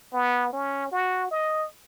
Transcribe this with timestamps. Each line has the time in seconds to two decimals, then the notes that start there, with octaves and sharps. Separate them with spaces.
0.13 B3
0.53 C#4
0.91 F#4
1.31 D#5